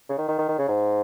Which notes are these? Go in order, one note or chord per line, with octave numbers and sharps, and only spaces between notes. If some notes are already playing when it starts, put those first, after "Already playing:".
C#3
D#3
D#3
D#3
D#3
C#3
G#2